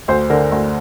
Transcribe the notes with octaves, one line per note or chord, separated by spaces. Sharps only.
D2 C5
D3 A#4
D2